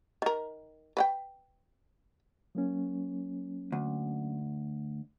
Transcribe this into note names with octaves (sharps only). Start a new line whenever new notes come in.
D#3 A#4
B4 F#5 G5
F#3 A#3 C#4
D2